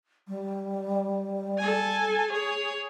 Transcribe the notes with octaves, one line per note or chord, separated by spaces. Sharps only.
G3
A4 G#5
G#4 C#5